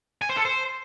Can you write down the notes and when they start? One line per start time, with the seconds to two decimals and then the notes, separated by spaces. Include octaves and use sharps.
0.22 G#5
0.29 C5
0.37 A4
0.45 C5